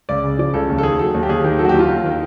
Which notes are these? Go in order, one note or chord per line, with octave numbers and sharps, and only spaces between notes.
C#2 D5
C#3
F3 D5
C#2 A4
D#2
A4
D#3 G#4
F#3 A4
D#2
G4
D#2 G#4
D#3 G4
F#3 A4
F#4
G4
D#2
F4
D#2
D#3